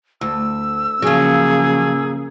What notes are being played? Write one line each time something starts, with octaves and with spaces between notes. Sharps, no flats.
D2 E6
C#3 F3 F#3 A#3 G#4